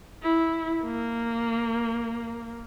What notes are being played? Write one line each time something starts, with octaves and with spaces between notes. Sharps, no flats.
E4
A#3